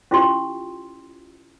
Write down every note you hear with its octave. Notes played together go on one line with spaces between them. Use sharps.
C#4 E4 F4 G4 C6